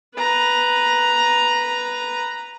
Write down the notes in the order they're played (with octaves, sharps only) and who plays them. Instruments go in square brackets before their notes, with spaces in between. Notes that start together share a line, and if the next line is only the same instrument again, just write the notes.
[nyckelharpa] B4 A#5